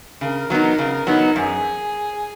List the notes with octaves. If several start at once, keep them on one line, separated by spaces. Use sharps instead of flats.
C#3 A#4
F#3 B3 D#4
C#3
F#3 B3 D#4
F#2 G#4